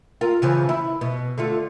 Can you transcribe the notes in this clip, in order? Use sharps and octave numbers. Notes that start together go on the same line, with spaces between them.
F4 A#4
C#3 E3 F3
E4
B2
D3 A3 F4